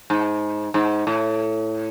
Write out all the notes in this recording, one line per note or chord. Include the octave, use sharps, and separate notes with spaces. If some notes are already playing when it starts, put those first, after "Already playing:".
G#2
G#2
A2